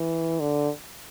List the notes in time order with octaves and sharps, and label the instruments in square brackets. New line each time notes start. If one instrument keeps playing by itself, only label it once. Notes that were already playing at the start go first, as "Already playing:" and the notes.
Already playing: [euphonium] E3
D3